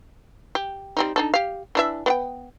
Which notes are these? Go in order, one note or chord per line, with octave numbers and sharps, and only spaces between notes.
G4
G3 C4 D#4
D4 D#4 A4
G4 F5
E3 D4 E5
B3 F#5 G5